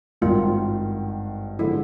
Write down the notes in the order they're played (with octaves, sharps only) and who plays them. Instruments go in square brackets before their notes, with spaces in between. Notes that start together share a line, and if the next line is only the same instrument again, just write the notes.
[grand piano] G#1 G2 D#3 [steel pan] F4
[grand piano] D3 F3 G#3 [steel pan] E4